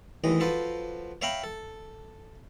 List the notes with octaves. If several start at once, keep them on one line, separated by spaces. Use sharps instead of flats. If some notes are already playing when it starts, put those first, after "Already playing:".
A1 D#2 A2 E3 D#5
F3 F#4 A4 B4 C5
C#5 E5 F5 G5 A#5 B5
A4